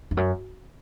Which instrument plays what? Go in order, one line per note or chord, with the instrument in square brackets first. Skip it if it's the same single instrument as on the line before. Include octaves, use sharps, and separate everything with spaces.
[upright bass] F2
F#2